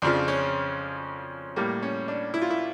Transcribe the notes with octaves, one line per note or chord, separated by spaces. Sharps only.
F2 C#3 F3 D4
C#4
A2 G3 A#3
C#4
D4
E4
F4
E4